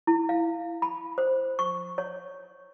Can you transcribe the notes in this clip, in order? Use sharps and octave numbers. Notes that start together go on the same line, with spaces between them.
E4
F5
B5
C5
C#6
C#5